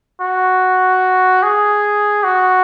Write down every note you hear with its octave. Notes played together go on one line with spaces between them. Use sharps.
F#4
G#4
F#4